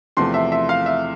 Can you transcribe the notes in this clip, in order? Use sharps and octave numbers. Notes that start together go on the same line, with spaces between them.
E2 C3 F3 A3 C6
E5
E5
F5
E5